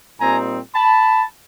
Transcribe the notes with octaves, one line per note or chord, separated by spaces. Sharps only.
A#2 G3 C4 D#4 G#5 A#5
A5 B5